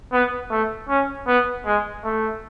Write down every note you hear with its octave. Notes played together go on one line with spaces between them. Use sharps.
B3
A3
C#4
B3
G#3
A3